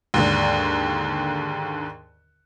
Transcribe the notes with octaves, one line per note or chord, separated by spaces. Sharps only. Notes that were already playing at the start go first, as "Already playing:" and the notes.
D#2 G#2 D3